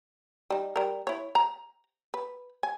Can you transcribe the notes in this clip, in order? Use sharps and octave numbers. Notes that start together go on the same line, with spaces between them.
G3 D#4
G3 A#4
E4 C#5
A#5
B4
G#5